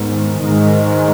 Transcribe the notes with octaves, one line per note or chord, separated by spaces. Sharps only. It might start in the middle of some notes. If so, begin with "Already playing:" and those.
Already playing: G#2 D#3 G#3 B3
G#2 D#3 G#3